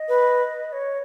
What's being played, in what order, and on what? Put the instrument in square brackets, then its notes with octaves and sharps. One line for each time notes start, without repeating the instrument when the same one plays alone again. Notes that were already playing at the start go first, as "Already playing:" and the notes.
Already playing: [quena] D#5
[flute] B4
[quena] C#5